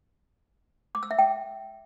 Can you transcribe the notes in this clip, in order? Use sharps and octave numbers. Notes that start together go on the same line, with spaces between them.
D6
E6
E5
G5